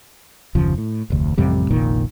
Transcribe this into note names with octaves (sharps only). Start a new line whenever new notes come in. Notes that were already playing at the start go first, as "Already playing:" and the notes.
F#1 D#2 C#3 F3
A2
F1 D2
A1 F2 C3 G3
F1 A#1 A#2 D#3